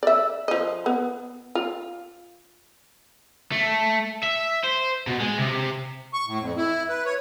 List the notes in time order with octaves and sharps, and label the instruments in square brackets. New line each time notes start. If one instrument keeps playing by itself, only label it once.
[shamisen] D5 E5
F3 D#5
B3
F4
[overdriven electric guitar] A3
E5
C5
B2
G#3
C3
[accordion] C#6
A2
F2
E4
B4
C#5